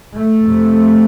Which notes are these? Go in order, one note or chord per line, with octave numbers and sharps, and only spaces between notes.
A3
F2 C3